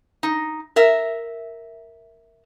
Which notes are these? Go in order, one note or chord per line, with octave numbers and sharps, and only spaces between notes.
D#4
A#4 E5